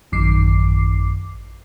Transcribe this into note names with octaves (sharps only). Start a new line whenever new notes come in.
A1 F#2 D#3 D6 C7